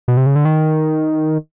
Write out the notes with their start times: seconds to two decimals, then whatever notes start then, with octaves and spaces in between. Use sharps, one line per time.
0.08 B2
0.17 C3
0.26 C#3
0.36 D3
0.45 D#3